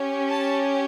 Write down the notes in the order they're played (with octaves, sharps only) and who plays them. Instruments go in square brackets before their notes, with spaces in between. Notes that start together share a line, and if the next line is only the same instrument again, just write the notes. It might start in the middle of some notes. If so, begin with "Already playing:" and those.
Already playing: [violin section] C#4 G4
A5